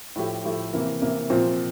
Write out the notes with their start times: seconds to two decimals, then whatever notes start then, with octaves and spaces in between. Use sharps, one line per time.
0.16 A2 F3 A3 E4 G4
0.44 A2 F3 A3 E4 G4
0.73 C3 E3 A#3
1.02 C3 E3 A#3
1.30 A#2 F3 C4